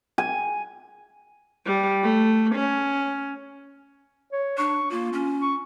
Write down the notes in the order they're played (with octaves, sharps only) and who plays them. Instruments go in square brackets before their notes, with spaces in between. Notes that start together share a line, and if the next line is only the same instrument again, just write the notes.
[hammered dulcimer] G#5
[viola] G3
A3
C#4
[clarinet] C#5
[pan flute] D4 [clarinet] C#6
[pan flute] A#3 [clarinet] F4
[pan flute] C#4
[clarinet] C#6